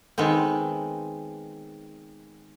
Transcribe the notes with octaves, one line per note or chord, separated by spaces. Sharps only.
D#3 G#3 B3 C4